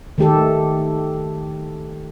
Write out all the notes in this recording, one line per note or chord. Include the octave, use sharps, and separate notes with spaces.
D#3 A3 G4 A4